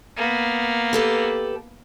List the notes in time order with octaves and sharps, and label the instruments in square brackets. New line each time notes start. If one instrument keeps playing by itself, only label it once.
[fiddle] A#3 B3
[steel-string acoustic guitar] G4 A4 B4